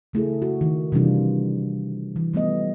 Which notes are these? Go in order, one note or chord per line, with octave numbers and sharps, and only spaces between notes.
C#3 A3 E4 G#4
F#4
D#3
C3 E3 G3 D4 F4
E3
F3 G3 A3 B3 D#5